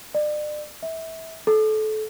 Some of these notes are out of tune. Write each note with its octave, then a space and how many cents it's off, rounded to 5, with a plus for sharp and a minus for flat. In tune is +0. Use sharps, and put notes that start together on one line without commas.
D5 +35
E5 -25
A4 -25